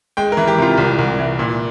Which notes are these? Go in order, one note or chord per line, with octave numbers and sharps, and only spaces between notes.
G#3 G5
A#4
E3
G4
C3 F4
C2
C2
E3
A#2